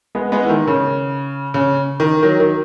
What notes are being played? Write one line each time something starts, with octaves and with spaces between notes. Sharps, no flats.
G#3 B3
G#3 B3
E3
D#3
C#3
C#3
D#3
D#3 F#3
D#3